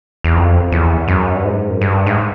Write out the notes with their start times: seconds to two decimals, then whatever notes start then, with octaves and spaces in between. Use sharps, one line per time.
0.24 E2
0.36 F2
0.72 E2
1.08 F#2
1.36 G2
1.44 G#2
1.70 F#2
1.81 G2
2.06 G#2